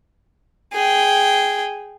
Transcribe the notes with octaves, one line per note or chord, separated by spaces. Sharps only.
G#4 G5